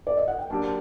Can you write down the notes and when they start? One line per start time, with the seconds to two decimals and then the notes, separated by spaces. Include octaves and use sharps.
0.07 D5
0.17 D#5
0.28 F#5
0.39 G5
0.50 F#3 A#3 D4 G4 A5